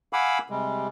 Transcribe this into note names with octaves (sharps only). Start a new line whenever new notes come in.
F5 F#5 G#5 B5 D6 E6
C3 G3 G#3